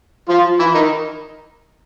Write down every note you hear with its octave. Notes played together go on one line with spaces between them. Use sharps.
F3 F4
E3 E4
D#3 D#4